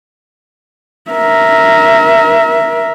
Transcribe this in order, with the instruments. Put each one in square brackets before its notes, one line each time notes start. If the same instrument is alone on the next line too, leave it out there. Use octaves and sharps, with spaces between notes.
[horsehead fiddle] A#4 E5